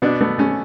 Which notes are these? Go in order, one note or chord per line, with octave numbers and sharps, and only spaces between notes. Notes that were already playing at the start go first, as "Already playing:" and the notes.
B2 B3 D4
A3 B3
A3 C#4